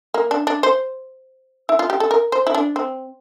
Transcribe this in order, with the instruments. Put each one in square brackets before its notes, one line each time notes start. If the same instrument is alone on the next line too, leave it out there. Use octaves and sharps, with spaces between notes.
[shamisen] A#3
D4
D4
C5
E4
F4
G4
A4
A#4
C5
E4
D4
C4